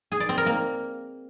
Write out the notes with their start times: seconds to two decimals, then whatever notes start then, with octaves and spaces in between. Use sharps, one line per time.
0.12 G#4
0.20 D5
0.29 C4
0.38 A#4
0.46 A#3